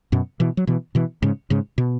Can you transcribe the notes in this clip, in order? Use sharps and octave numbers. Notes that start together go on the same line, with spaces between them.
F#2 B2
B2 E3
F#3
B2 E3
B2 E3
G#2 C#3
G#2 C#3
B2